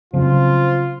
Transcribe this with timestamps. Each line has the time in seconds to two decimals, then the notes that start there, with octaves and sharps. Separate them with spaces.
0.14 C#3 F3 F#3 C4 F4